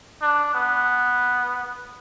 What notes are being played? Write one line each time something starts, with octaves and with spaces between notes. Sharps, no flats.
D4
B3